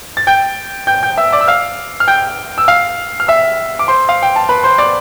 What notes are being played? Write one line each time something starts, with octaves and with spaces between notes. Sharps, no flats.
A6
G5 G6
G5 G6
G5 G6
E5 E6
D5 D6
E6
F5 F6
F6
G5 G6
E6
F5 F6
F6
E5 E6
D6
C5 C6
F5
G5
A5
B4 B5
C5 C6
D5 D6